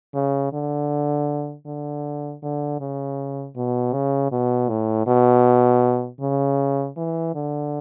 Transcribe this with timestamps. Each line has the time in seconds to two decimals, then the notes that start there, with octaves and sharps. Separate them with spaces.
0.14 C#3
0.53 D3
1.66 D3
2.43 D3
2.81 C#3
3.56 B2
3.93 C#3
4.32 B2
4.69 A2
5.07 B2
6.21 C#3
6.97 E3
7.35 D3